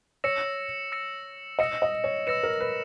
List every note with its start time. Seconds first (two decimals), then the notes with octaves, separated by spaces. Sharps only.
0.24 C#5 E6 A#6 C#7 E7
0.92 E6 A#6 C#7 E7
1.59 D#5 E6 A#6 C#7 E7
1.82 D#5
2.04 C#5
2.27 B4 E6 A#6 C#7 E7
2.44 A#4
2.60 B4